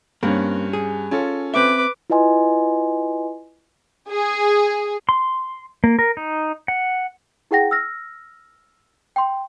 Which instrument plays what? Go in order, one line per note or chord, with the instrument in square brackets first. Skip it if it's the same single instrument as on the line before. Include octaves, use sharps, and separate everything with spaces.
[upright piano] G2 C#4 [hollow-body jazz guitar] A#3 C4
[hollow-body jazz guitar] G#4
[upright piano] C#4 F4 A4
[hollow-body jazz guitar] C4 E5 [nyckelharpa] B4 D6
[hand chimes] E4 F4 B4 D#5 G#5 C6
[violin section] G#4
[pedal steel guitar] C6
A#3
A#4
D#4
F#5
[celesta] E4 G#4 F#5 G5 A#6
E6 F6 A#6
G5 C6